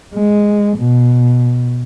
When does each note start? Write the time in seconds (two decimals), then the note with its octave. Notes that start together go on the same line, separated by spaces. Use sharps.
0.14 G#3
0.78 B2